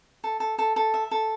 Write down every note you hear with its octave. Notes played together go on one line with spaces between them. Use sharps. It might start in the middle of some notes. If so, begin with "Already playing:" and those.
A4
A4
A4
A4
E5
A4